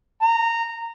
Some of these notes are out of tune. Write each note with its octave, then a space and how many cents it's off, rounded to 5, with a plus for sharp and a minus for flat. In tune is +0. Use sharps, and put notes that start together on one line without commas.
A#5 -15